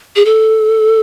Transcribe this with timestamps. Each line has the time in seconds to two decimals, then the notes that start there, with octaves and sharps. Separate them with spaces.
0.16 G#4
0.25 A4